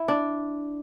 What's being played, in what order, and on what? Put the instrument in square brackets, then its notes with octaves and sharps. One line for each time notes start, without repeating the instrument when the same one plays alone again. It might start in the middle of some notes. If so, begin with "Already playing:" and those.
Already playing: [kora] E4
D4